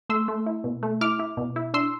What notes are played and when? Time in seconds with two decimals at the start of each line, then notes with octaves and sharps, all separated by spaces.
0.10 A3 C6 E6
0.28 A3
0.46 E4
0.64 B2
0.83 A3
1.01 E4 D6 F6
1.19 E4
1.37 B2
1.56 E4
1.74 D4 C6 E6